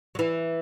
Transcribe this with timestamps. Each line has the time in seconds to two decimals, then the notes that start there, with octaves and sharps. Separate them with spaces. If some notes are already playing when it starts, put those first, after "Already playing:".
0.15 F#3
0.19 E3